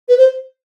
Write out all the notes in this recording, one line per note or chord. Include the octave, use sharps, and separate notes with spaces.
B4
C5